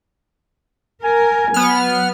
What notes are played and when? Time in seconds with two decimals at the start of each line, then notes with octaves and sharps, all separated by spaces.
1.04 A#4 G#5
1.54 F#3 B3 F6